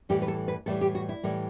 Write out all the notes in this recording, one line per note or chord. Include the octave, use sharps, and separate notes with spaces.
A2 E3 G3 G4
B4
A4
B4
A2 E3 G3 A4
G4
F#4
E4
A2 E3 G3